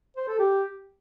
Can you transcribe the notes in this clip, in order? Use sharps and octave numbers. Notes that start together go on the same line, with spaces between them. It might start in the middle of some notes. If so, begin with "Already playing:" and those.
C5
A4
G4